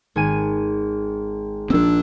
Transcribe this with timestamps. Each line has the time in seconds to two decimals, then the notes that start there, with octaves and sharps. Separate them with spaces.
0.16 G#1 G#5 D#7
1.70 A#1 C4 D4 E6